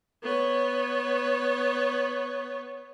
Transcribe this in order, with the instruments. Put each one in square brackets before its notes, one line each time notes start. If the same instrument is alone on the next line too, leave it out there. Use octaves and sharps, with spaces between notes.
[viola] B3 C#5